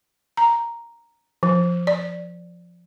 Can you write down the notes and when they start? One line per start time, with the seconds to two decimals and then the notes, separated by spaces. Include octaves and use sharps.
0.37 A#5
1.43 F3
1.87 D5